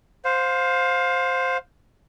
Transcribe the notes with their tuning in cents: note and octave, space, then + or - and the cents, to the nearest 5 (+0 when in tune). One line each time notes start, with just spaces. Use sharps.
C5 +0 F5 +25